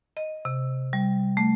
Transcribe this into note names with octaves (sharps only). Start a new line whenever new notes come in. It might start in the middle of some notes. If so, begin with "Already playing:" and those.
D#5
C3
G3
A3